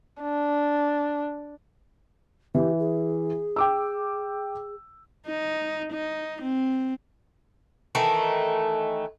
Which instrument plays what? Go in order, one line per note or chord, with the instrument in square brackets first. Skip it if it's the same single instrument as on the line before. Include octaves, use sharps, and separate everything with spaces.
[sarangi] D4
[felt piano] E3 [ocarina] G4
[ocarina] G#4
[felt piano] G5 D6 E6
[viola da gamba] D#4
D#4
C4
[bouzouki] D#3 E3 A3